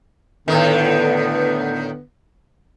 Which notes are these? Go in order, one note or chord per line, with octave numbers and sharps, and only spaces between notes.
A2 D3 D#3 B3